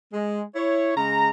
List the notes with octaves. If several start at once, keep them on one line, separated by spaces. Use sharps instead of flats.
G#3
E4 C#5
C#3 G#3 A#5